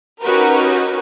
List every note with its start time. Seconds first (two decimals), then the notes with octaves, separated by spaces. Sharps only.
0.22 C#4 D#4 F#4 G4 A#4 B4